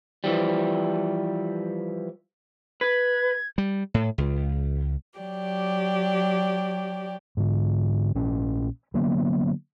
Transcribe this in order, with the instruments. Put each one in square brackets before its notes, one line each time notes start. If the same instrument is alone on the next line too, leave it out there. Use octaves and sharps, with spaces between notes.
[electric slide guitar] E3 F3 G3
[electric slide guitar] B4 [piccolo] G#6
[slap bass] G3
A2
C#2
[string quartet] F#3 G4 D5
[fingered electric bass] G#2 D3
A#1 A#2 C#4
D3 F#3 A#3 B3